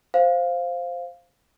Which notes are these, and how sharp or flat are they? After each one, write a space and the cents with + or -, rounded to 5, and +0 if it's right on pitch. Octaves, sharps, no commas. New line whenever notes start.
C5 +0 F5 +0